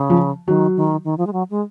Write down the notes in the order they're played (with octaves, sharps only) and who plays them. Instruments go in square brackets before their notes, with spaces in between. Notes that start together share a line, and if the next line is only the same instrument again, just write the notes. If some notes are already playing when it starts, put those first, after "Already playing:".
Already playing: [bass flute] C#3
[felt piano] F3
[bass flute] D#3 [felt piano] F#3
[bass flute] D#3
D#3
F3
G#3
F#3
G#3